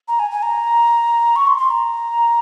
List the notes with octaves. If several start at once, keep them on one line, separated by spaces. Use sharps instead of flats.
A#5
G#5
G#5
A#5
C#6
C6
C6
A#5